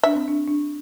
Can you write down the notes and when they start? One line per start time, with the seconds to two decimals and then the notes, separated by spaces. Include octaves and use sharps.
0.03 D4 E5
0.15 C4
0.28 D4
0.48 D4